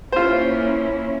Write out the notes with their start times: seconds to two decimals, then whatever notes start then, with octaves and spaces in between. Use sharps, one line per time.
0.12 A#3 C#4 E4 F4 C5